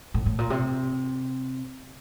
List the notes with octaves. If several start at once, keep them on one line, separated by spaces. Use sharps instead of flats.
A2
A2
A#2
C3